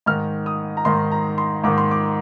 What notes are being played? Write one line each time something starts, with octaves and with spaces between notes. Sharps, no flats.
G#2 D#3 F6
D#6
A#5
G#2 D#3 C6
A#5
C6
G#2 D#3 D6
C6
D6